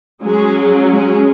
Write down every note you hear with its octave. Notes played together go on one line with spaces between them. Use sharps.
F#3 G#3 C#4 G#4
G#3 G#4